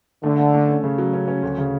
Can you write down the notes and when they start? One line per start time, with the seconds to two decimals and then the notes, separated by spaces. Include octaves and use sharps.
0.23 D3 A3
0.38 A3
0.54 A3
0.68 C#4
0.84 C#3
0.98 F#3
1.13 C#4
1.28 C#4
1.43 D2
1.58 C#3